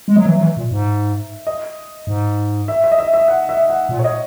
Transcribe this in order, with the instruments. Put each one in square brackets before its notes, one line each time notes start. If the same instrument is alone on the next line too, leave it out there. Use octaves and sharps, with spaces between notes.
[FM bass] G#3
[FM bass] F#3 [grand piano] D#5
[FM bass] E3 [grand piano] E5
[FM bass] F#3
E3
A#2
G#2
[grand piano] D#5
[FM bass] G#2
[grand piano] E5
E5
D#5
E5
E5
F#5
E5
F#5
[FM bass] A#2
[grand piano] C#5
D#5